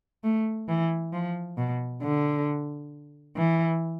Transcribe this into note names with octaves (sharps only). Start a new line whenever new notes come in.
A3
E3
F3
B2
D3
E3